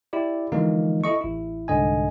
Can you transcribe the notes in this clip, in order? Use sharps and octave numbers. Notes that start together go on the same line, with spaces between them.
E4 G4 D5
D3 E3 F3 G#3 A#3 D#4
E4 A4 D#5 C#6
A1 E4
C2 G#2 D3 D#5 G#5